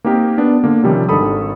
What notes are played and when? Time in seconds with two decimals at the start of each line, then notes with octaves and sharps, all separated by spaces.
0.05 A#3 C4 D#4 G4 A#4
0.38 B3 D4
0.64 D3 A#3
0.83 C3 D#3 F3 G3 C4 C#4
1.09 G#1 D3 D#3 A4 B5 D#6